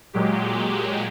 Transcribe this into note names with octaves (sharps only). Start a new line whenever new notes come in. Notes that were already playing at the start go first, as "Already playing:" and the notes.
A#2 F#3 G#3 G4